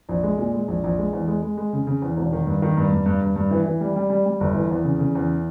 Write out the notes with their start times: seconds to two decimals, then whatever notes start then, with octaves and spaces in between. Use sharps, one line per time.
0.09 A#1
0.23 G#3
0.38 A#2
0.54 G#3
0.68 A#1
0.84 A#1
0.98 G#3
1.13 E2
1.28 G#3
1.42 G#3
1.57 G#3
1.73 C#3
1.87 C#3
2.02 E2
2.17 E1
2.32 D#3
2.47 G2
2.62 D#3
2.77 G2
2.92 G2
3.06 G2
3.22 G2
3.36 G2
3.51 E3
3.66 E3
3.81 G3
3.96 G3
4.10 G3
4.26 G3
4.40 G1
4.55 E3
4.70 E2
4.85 C#3
4.99 C#3
5.15 E2